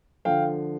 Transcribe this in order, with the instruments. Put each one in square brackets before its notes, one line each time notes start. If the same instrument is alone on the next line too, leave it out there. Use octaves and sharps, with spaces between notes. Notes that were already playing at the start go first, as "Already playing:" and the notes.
[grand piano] D3 F3 F5 G5